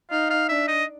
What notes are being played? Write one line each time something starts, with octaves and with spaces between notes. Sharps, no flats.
D#4 F5
F5
D4 E5
D#5